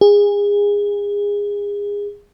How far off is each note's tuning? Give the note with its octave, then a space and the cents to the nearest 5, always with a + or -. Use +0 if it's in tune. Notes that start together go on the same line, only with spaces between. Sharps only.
G#4 -25